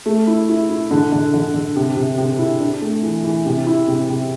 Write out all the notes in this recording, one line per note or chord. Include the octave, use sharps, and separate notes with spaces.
A3
E4
E4
E4
D3
D3
D3
D3
C3
C3
C3
E4
D4
A3
E3
E3
C3
E4
C3
C3